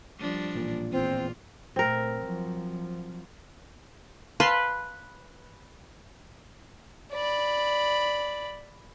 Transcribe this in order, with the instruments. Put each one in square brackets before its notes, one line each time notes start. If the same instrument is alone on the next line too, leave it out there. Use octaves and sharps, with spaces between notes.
[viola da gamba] F3 G3 D4
[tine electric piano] A1 A#2
[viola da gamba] E2 F4 [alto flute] C4
[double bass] A#2 A3 [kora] C4 A#4
[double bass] F3 F#3
[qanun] B4 [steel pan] F5 A5 C6
[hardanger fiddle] D5 B5